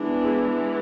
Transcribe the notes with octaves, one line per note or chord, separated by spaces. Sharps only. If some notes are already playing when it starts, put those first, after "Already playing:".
Already playing: E3 G#3 B3 D4
E4 G#4